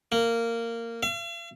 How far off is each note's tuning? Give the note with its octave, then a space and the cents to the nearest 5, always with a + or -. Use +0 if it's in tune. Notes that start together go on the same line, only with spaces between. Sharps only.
A#3 -15
F5 -45